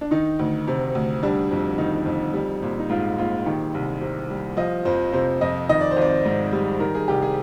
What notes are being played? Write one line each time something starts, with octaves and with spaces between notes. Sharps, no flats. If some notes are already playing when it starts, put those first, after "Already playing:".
D4
D#3 D#4
D2
C3
D2
G3 D4
F2
D#3 D#4
F2
G3
A#1
D#4
G#2 F4
A#1 F4
D#3 G4
C2
C3
G3
F3 D#5
F2 C5
C3 C5
F2 D#5
D#3 D#5
D5
C5
G#1 D5
G#2
G3
D#3 A#4
G#4
C2 G4
G#4